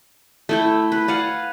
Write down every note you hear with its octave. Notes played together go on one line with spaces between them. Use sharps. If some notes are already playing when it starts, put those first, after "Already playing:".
A3 E4 G5
B4
D5 F5 F#5 G#5